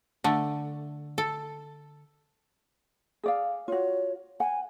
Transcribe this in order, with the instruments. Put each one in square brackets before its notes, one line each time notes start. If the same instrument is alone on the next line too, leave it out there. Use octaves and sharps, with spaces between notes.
[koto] D3 A3
A4
[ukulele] G#4 D5 F5
[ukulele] F4 F#4 [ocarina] C#5
[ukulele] F#5 [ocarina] G#5